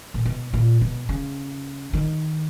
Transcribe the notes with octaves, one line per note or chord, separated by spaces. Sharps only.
A#2
B2
A#2
B2
C#3
D#3